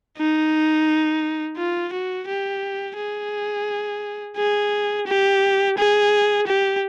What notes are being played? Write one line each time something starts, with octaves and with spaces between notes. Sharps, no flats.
D#4
F4
F#4
G4
G#4
G#4
G4
G#4
G4